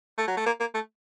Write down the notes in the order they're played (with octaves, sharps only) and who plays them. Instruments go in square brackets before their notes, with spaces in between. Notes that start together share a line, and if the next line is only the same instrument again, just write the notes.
[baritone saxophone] A3
F#3
A3
A#3
A#3
A3